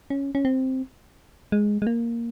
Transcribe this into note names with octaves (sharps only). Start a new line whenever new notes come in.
C#4
C#4
C4
G#3
G#3
A#3